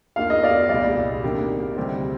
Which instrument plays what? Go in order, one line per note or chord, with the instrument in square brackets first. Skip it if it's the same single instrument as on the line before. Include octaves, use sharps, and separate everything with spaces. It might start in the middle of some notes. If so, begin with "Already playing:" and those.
[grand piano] D#2 D#3 A#3 D4 F4 [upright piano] F5
[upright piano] D#5
D5 F5
[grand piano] C2 A#2 G3 [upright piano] D5 F5
[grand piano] C3 D#3 A#3 D4 G4
D2 C3 G3 C4